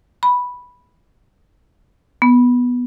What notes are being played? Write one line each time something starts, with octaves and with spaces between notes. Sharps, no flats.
B5
B3